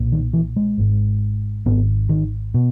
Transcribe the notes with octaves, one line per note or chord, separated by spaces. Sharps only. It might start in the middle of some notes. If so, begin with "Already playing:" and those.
Already playing: B1 A#2
D#3
E3
G#3
G#1 G#2
G#1 G#2 B3
D#3
B2